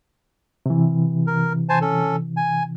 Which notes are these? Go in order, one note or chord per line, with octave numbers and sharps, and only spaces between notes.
C3 E3
A#4
C5 G#5 A5
C#4 A4
G#5